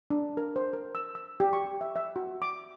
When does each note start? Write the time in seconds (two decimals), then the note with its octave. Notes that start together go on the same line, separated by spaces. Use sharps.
0.10 D4
0.37 A#4
0.56 C5
0.73 A#4
0.95 E6
1.15 E6
1.40 G4
1.53 C#6
1.81 E5
1.96 E5
2.16 F#4
2.42 D6